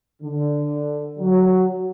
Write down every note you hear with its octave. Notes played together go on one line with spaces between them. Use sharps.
D3
F#3